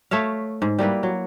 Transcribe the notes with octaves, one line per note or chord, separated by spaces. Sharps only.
A3 C#5 E5 F5
G#2
G3 A#3 E4 B4
F#3